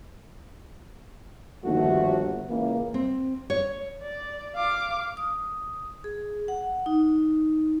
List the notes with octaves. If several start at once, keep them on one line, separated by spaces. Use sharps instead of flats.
G1 D#2 F3 A3 F#4
C#2 E3 A#3
C4
C#5
D5
F5 D6
D#6
G#4
F#5
D#4